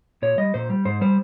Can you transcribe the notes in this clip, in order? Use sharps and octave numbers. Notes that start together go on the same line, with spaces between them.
A#2 C#5
G3 D#5
A#2 C5
G3
G#2 C5
G3 C5